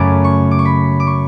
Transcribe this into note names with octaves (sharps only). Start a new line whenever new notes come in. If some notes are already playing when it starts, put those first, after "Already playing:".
Already playing: F#2 C#3 F#3 A3 B5 D6
C#6
D6
C#6
B5
D6
C#6